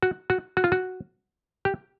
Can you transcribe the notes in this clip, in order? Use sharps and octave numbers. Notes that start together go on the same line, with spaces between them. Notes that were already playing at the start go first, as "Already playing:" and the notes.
F#4
F#4
F#4
F4
F#4
G4